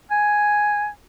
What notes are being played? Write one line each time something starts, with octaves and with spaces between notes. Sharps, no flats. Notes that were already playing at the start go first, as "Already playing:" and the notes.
G#5